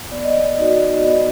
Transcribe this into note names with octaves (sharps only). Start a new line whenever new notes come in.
B3 D5
D#5
D5
D#4 F#4
B3 D#5